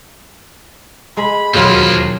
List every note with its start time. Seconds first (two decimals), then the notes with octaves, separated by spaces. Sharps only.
1.17 G#3 B5
1.54 E1 D#2 C#3 F3 F#3 A#3 F4 F#4